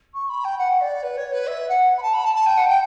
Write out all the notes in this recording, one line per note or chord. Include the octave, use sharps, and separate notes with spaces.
C#6
B5
G5
F#5
D5
B4
C#5
B4
E5
F#5
B5
A5
B5
A5
A5
G5
F#5
G5